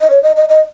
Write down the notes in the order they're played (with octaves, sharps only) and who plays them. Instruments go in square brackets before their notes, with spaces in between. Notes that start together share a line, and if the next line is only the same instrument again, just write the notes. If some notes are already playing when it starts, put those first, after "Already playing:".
[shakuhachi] D#5
C#5
D#5
D#5
D#5